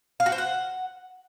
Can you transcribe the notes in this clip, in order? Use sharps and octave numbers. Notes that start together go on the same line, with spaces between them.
F5
F#4
C5
F#5